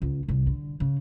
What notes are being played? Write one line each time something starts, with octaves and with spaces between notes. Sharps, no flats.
C#2
C2
D3
C#3